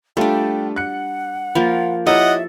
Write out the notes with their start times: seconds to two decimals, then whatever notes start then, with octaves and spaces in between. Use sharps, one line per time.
0.17 G3 A3 D4 F4 A4 G5
0.76 F#5 F#6 C#7
1.55 F3 A#3 F4 B5
2.07 E4 G4 A4 C#5 D#5 E5 F#5